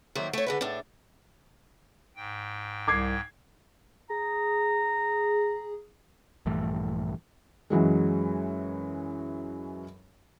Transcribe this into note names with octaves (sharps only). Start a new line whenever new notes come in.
F2 D#3 F#3 A#3 C5 E5
A3 C#5
D3 G#3 B4
A2 D4
G#2 G5
C2 D6 G#6 C7
G#4 A#5
A#1 G2 E3 A3
F#2 E3 F#3 G#3